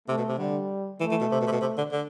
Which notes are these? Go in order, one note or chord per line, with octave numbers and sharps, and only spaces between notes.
C3 A3
B2
C3
D3 G3
E3 A3
E3
B2
C3
B2
C3
B2
C3
D3
D3